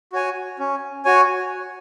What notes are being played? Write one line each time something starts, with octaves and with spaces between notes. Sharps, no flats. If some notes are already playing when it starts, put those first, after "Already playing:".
F#4 C#5 G#5
C#4
F#4 C#5 G#5